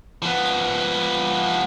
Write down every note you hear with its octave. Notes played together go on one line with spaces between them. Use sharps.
F3 B3